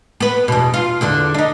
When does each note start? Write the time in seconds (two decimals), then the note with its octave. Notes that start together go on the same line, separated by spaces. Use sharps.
0.20 B3 B4
0.48 E2 B2
0.74 F4
1.01 E2 D3 D4
1.34 D4 D#4